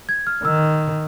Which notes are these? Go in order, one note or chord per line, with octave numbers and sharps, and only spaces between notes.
G#6
F6
D#3 E6